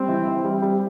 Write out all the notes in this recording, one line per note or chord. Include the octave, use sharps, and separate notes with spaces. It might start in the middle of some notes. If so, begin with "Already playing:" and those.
Already playing: G3 C4
E3
E3
G3
G3